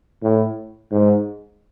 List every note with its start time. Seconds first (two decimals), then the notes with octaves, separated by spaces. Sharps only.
0.23 A2
0.91 G#2